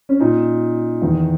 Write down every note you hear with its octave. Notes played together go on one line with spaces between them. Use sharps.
C#4
A#2 D#4
E2 D#3